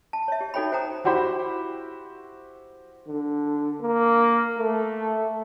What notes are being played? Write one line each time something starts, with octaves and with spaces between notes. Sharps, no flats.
A5
C#5 E5
G4
D#4 F#4 A4 C#5 G5 B5
C5 F#5 G5 A#5 D#6
E4 F#4 G4 C5 B5
D3
A#3
A3